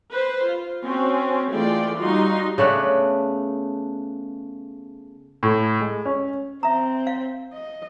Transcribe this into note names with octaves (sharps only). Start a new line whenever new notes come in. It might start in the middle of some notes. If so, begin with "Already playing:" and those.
B4 C5
F4
C4 C#4 F#4
E3 G#3 A3 F4 D5 G5
G3 D#4 F4 F#4 C6
C#3 A3 B3 D4
A2
G#3
C#4
C4 E5 A#5
F5
D#5